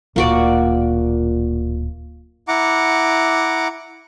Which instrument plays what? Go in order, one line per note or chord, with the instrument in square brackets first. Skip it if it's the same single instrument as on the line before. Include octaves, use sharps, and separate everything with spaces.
[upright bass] D1 [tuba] A#2 [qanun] A#3 F#4 D5
[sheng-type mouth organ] E4 F#5 A#5 D6